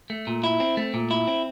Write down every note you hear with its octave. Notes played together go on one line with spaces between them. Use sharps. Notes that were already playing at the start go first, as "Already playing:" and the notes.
A3
A#2
E4
C4
A3
A#2
E4
C4